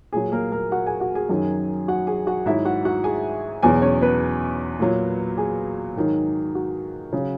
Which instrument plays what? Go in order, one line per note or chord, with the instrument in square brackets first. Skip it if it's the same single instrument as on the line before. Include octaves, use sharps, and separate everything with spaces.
[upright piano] A#2 F#3 G#4
A#3 A#4
A#3 A#4
F#4 F#5
G#4 G#5
F#4 F#5
G#4 G#5
F#2 D#3 F#3
F#4 F#5
G#4 G#5
F#4 F#5
G#2 D#3 F#3 E4 E5
F#4 F#5
F#4 F#5
G#4 G#5
E2 B2 F#3 G#4 G#5
C#4 C#5
B3 B4
A#2 F#3
G#4
G#2 D#3 F#3
F#4
C#3 F#3